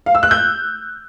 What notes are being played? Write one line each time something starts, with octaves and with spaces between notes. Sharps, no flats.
F5
E6
F#6
G6